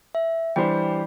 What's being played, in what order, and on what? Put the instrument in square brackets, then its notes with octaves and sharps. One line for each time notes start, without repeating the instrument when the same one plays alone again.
[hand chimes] E5
[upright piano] E3 G3 D4 G4 C5 [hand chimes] G5